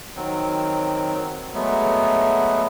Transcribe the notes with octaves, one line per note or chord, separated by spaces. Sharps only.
D#3 F#3 C4
F#3 G#3 A3 B3